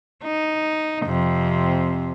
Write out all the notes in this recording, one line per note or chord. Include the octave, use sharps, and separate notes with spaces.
D#4
F2 C3